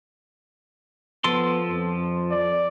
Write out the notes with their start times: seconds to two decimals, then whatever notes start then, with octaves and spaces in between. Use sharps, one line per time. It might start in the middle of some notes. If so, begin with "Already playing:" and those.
1.24 F3 B3 A4 C6
1.70 F2
2.31 D5